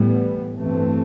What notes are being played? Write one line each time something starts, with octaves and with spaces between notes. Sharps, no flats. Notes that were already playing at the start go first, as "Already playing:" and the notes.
Already playing: A2 E3 G3 B3
G2 E3 A3 C4